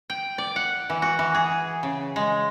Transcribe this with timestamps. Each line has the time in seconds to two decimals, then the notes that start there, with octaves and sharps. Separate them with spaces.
0.10 G5
0.38 D5
0.56 F#5
0.90 E3
1.02 F#4
1.19 E3
1.35 G#4
1.83 C#3
2.16 G#3